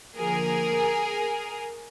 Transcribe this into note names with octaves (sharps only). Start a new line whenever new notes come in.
D3 F3 A#3 G#4 A#4